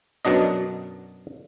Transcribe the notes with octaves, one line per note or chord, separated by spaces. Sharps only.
F#2 B2 F#3 D4 D#5